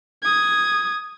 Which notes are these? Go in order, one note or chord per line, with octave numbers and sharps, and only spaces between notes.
D#6 G#6